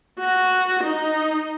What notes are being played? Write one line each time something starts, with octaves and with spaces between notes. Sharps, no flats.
F#4
D#4